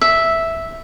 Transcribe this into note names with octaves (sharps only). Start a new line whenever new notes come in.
E5